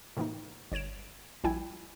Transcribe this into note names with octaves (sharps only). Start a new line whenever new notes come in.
A2 C3 E3 A#3 D#4
G1 C#5 G#6 D7 E7
A#1 G3 E4 G5 G#5 G#6